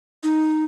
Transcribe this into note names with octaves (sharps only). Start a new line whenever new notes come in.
D#4